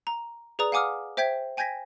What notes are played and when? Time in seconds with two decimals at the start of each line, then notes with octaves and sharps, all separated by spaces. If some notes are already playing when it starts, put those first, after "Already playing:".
0.07 A#5
0.59 G#4 B4 D5 A#5 D#6
0.72 F5 F#5 G#5 D6 D#6 F6
1.17 C5 E5 G5 G6 G#6 B6
1.57 G5 G#5 G6 G#6 A#6 B6